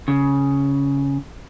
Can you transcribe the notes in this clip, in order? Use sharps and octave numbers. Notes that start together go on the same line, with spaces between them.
C#3